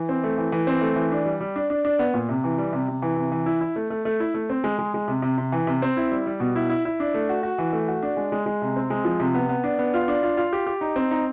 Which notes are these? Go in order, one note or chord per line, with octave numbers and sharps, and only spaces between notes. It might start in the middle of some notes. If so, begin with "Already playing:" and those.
Already playing: E3
C4
A3
E3
E3
C4
A3
E3
D4
G3
G3
D4
D4
D4
B3
A#2
C3
E3
G3
C3
C3
E3
C3
E3
E4
E4
A3
A3
A3
E4
A3
C4
G#3
G#3
G#3
C3
C3
C3
E3
C3
C4
E4
G3
G3
B2
E4
E4
E4
D4
A3
F#4
F#4
E3
A3
F#4
D4
G#3
G#3
G#3
C3
C4
G#3
F3
C3
B3
B3
D4
B3
F4
D4
F4
F4
G4
G4
D#4
C4
D#4